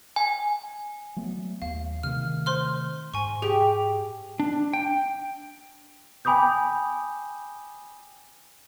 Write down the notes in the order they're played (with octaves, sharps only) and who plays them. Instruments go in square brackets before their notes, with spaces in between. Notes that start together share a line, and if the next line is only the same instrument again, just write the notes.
[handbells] G#5
[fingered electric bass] F#3 A3 B3
[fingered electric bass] D#2 [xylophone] F5
[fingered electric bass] C3 D#3 A3 [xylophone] F6
[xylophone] C5 C6 F6
[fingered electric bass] G#2 [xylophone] G#5 C#6
[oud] G4 [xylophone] G#4
[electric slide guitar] D4
G5
[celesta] G5 G#5 B5 D6 D#6 G6